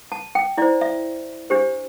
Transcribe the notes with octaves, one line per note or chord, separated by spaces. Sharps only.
A5
G5
E4 C5 D5
E5
D4 G4 C5